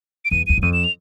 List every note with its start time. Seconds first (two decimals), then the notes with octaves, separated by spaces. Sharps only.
0.25 D7
0.31 E2 D#7
0.47 E2 D#7
0.58 F#2
0.62 F2 D#7
0.73 E7
0.84 F7